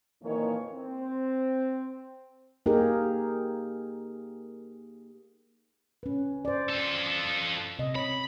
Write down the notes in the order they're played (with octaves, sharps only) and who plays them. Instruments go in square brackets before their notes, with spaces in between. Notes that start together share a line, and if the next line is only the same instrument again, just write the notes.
[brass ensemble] F2 A#2 D#3 E3 A#3 C#5
C4
[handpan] A#3 D#4 G4 G#4 A#4
C#4 B4
C5 D5
[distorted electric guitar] F4 A4
[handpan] C3 D#5
[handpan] C#5 [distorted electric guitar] B5